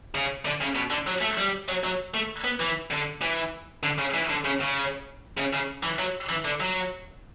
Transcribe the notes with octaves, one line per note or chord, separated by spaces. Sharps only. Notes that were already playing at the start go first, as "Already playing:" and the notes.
C#3
D3
C#3
B2
D3
F#3
A3
G3
F#3
F#3
A3
B3
E3
D3
E3
D3
C#3
E3
D3
C#3
C#3
C#3
C#3
E3
F#3
E3
D3
F#3